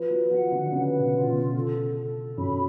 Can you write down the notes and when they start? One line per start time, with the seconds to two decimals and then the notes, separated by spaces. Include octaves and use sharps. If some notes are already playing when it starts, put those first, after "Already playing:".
Already playing: F3 B4
0.10 F#3
0.31 F3 F#5
0.52 D3
0.72 C#3 B4
1.00 B2
1.13 F4
1.27 B2
1.55 A4
1.96 A4
2.38 F#2 B5